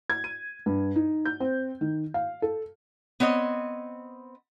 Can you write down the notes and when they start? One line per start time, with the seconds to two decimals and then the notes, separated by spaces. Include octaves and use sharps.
0.10 G#6
0.24 D#7
0.66 G2
0.96 D#4
1.25 G6
1.40 C4
1.81 D#3
2.14 F5
2.42 A4
3.20 B3 C4 C#5 D#5